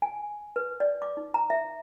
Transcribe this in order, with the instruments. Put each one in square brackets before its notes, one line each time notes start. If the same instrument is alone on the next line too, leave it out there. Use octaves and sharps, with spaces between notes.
[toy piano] G#5
B4
D5
D6
D#4
A#5
E5